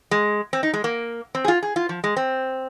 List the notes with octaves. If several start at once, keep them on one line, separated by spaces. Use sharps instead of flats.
G#3
C4
D#4
G#3
A#3
C4
G#4
F4
G#4
F4
F3
G#3
C4